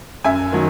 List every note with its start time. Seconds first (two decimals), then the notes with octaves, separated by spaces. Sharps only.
0.24 F#2 E5 G#5
0.52 D#3 F#3